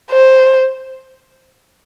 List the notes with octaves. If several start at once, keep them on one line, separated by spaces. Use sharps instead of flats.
C5